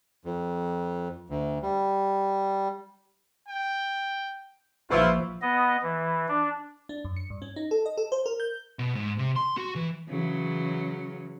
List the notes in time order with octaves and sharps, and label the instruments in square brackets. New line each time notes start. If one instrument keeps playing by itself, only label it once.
[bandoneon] F2
D2
G3
[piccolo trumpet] G5
[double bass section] A#1 F3 [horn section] E4 F4 [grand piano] B4 C#6 E6 [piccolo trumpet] C5
[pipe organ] B3 D#5
E3
D4
[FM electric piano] D4
F#2
C#7
G2
C#4
D#4
A4
D#5
A4
C5
A#4
G6
[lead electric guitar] B2
G#2
C3
C6
F#4
E3
[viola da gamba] C#3 E3 F#3